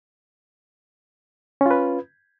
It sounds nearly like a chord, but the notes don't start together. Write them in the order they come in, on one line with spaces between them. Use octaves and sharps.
C#4 F4 B4